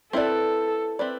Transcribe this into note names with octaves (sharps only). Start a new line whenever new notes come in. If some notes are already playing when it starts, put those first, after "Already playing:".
C4 E4 A4 B4 D5
C4 E4 B4 D5